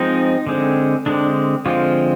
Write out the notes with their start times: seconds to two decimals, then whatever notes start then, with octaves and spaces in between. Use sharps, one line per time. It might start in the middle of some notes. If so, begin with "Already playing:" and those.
Already playing: F3 G#3 C4 D#4
0.47 D3 G#3 C4
1.06 D3 G#3 C4 D4
1.66 D3 F3 G#3 C4 F4